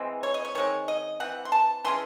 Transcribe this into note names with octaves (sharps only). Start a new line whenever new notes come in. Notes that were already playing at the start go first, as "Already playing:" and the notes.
Already playing: E3 G#3 C4
C#5
D#5
C#5
D#3 G#3 C4 C#5
D#5
E3 C4 F#5
C6
A5
E3 G#3 C#4 C6